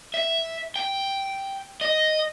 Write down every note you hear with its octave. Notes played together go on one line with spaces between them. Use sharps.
E5
G5
D#5